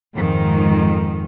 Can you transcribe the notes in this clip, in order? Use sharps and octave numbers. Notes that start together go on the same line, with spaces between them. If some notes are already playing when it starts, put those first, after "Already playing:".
F2 G#2 D#3